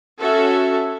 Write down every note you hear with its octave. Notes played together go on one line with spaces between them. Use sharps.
C#4 F#4 A4 E5